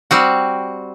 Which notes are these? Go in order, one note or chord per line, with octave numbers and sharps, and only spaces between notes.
G3 C4 F#4